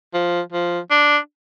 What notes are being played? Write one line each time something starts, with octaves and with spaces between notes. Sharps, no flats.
F3
F3
D4